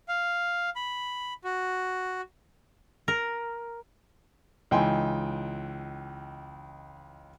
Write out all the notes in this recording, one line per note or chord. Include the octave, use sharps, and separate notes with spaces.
F5
B5
F#4
A#4
C#2 E3 D#4 G5 G#5 C6